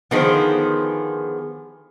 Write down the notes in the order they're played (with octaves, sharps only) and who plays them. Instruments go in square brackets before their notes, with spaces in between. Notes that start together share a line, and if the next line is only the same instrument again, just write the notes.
[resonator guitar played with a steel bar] D3 D#3 F3 [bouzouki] B3 G#4 C5